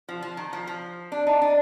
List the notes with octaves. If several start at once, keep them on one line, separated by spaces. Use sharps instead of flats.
F3
F3
D#3
F3
F3
D4
D#4
D4